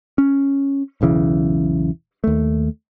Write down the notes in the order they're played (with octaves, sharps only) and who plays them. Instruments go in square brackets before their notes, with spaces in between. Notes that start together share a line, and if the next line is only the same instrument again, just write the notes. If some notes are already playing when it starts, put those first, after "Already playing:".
[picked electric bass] C#4
E1 B1 C#3 E3
D#2 A3